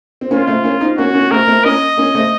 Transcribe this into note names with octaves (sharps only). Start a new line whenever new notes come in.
C4
A#3 C#4 F4
A3 C4
A#3 C#4
C4 D#4
A#3 C#4 F#4
A#3 C#4
A3 C4 A#4
A3 C4
A#3 C#4 D#5
A#3 C#4
A3 C4